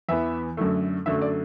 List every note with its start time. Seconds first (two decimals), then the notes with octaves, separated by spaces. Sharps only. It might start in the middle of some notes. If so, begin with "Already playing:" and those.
0.09 E2 E3 B3 E5
0.57 F#2 D3 F#3 A3
1.06 F#2 D3 F#3 A3 E5
1.22 D5